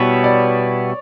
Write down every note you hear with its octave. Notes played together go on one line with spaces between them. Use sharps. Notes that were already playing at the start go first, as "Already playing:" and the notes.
Already playing: B2 G3 B3 E4 C#5
D5